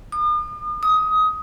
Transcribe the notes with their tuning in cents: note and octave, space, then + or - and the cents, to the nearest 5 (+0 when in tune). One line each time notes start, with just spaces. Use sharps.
D#6 -45
D#6 +20